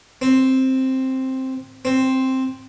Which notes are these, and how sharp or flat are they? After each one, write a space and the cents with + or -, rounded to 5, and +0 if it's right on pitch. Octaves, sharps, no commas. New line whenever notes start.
C4 +5
C4 +5